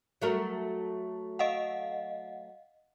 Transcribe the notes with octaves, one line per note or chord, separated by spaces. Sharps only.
F#3 A3 A#4
D#5 F5 F#5